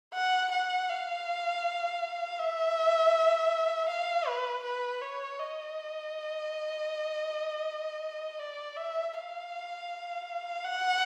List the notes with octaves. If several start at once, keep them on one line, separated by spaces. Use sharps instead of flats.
F#5
F#5
F5
E5
F5
B4
B4
C#5
D#5
D5
E5
F5
F#5